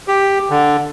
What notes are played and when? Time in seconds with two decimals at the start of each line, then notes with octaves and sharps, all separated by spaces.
0.08 G4
0.50 D3